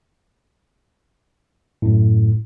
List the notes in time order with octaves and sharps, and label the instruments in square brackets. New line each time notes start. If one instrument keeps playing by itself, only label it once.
[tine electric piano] F#2 A2